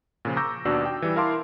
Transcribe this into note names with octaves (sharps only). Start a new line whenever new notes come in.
A#2 C#3 F3
A#5 C#6 D6 E6 G6 A#6
D#2 B2 D4 F#4 D5 E6
G5
E3 G3
E4 A#4 F5 A5 C6 D6